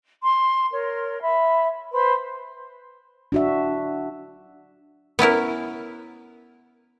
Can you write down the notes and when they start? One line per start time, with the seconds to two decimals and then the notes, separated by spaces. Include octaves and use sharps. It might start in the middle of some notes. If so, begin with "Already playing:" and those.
0.22 C6
0.72 A#4 C#5
1.22 E5 B5
1.93 B4 C5 B5 C6
3.32 D4 F#4 E5
5.19 B3 C#4 E4 A#4